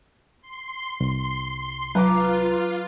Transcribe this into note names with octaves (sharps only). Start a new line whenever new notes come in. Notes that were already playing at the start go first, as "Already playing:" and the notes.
C6
C2
F#3 F4 B4 A#5 D6